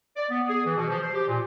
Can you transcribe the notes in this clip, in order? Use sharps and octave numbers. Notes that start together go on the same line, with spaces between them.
D5
B3
G#4
E3
B2
F3
C5
G4
A#2